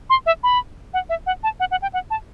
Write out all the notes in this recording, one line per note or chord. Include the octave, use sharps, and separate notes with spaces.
C6
E5
B5
F#5
E5
F#5
A5
F#5
F#5
G5
F#5
A5